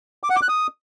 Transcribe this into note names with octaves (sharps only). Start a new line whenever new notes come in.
D6
F#5
D6
F#6
D#6